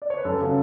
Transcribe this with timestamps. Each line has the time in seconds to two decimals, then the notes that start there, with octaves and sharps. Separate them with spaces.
0.02 D5
0.10 C#5
0.18 B4
0.25 F#2 A4
0.40 C#3 F#3 C#4